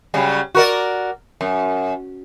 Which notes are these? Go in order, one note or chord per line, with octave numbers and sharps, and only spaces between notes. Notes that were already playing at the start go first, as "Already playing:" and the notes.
C#3 F#3 G3
F#4 A#4 D5
F#2